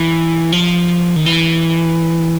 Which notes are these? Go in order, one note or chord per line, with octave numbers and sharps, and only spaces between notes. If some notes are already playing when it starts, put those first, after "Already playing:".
Already playing: E3
F3
D#3
E3